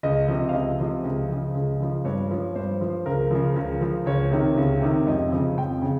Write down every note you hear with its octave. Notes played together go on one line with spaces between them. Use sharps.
C#2 D#5
C3 F3
F5
C#2 D#5
C3 F3
C#2
C#3 F3
C#2
C#3 F3
G2 C#5
F3
G2 C5
F3
C#2 A#4
C#3 F3
C#2
C#3 F3
C#2 C#5
C3 D#3
C#2
C3 D#3
F2 D#5
C#3 F3
F2 G5
C#3